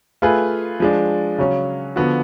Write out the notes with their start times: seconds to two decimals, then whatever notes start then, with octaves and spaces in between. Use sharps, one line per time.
0.22 A3 F4 G#4 B4
0.80 F3 G#3 D4
1.38 C#3 F#3 C#4
1.96 D3 F3 B3 F#4